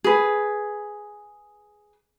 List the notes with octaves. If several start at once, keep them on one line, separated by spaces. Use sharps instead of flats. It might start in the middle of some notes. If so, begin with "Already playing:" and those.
G#4 B4